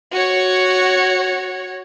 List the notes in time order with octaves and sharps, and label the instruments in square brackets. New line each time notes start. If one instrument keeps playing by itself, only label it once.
[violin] F#4 C#5